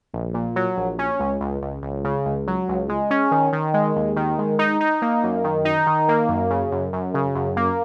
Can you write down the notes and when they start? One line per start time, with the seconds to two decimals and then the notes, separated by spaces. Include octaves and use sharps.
0.14 A#1
0.34 A#2
0.56 F#3
0.77 A#1
0.99 C#4
1.19 C#2
1.41 C#2
1.62 C#2
1.83 C#2
2.04 C#3
2.26 C#2
2.47 F#3
2.69 C#2
2.89 G#3
3.11 C#4
3.31 D#3
3.53 D#3
3.74 G#3
3.96 D#2
4.16 D#3
4.39 G#3
4.59 D#4
4.80 D#4
5.02 A#3
5.23 F#2
5.44 D#3
5.65 D#4
5.87 D#3
6.09 A#3
6.29 F#2
6.50 C#3
6.72 F#2
6.93 F#2
7.14 C#3
7.35 F#2
7.57 A#3